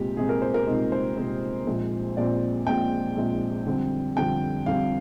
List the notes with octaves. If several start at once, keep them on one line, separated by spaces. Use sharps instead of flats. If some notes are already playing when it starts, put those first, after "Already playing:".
Already playing: C2 A#2 G#3 C4 G4
C2 A#2 G#3 C4 G#4
A#4
C5
A#4
C2 A#2 G#3 C4 D#4
C5
C2 A#2 G#3 C4
A#1 A#2 G#3 C4
A#1 A#2 G#3 C4 D5
A#1 A#2 G#3 C4 G5
A#1 A#2 G#3 C4
F2 D3 G3 C4
F2 D3 G3 C4 G5
F2 D3 G3 C4 F5